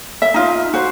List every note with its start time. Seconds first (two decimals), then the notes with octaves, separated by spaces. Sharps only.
0.22 E5
0.34 D#4 F4
0.74 F#4 C5